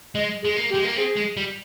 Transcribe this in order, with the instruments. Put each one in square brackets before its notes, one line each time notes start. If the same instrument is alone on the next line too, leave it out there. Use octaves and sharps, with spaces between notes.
[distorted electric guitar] G#3 [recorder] D#5
[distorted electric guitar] G#3 [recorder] G#4
[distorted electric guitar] A#3
[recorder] G4
[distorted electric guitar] G#3
A#3
[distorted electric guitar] C4 [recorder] G#4
[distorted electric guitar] G#3
G3